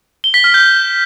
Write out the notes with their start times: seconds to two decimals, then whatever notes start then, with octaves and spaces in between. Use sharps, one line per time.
0.24 G7
0.34 B6
0.44 F6
0.54 G6